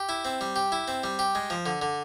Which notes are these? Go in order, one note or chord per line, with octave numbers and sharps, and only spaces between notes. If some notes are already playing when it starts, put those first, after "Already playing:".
Already playing: G4
E4
C4
G3
G4
E4
C4
G3
G4
G#3
F3
D3
D3